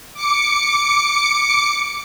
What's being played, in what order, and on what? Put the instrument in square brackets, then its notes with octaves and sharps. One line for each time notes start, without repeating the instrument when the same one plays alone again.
[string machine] D6 C#7